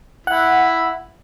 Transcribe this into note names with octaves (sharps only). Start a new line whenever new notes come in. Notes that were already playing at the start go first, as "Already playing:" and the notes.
E4 F#5